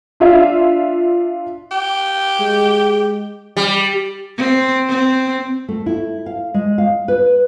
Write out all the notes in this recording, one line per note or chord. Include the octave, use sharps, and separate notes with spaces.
D4 F4 E5 F5
G4
G#3
G3
C4
C4
A3
E4
F5
G#3
F5
B4